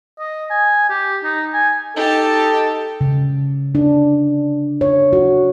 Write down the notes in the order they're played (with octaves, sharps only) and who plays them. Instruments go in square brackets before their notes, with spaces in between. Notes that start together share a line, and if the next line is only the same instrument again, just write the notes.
[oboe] D#5
G#5
G4
D#4
G#5
[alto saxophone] D#4 [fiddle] G4 A5 [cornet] A4
[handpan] C#3
D4
C#5
F#4